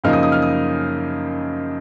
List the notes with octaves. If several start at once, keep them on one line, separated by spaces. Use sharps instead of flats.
F#2 C#3 F3 A#3 D#4 F6
D#6
D#6
F6
D#6